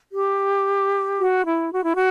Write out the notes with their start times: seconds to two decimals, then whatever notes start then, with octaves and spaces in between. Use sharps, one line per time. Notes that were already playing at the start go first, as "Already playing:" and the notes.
0.11 G4
1.17 F#4
1.44 E4
1.71 F#4
1.82 E4
1.93 F#4